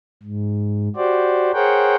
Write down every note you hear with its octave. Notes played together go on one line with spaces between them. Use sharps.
G#2
F#4 G4 C5 D5
G#4 A#4 C5 C#5 F#5 G5